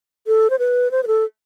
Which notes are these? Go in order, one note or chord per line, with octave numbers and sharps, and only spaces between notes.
A4
C5
B4
C5
B4
A4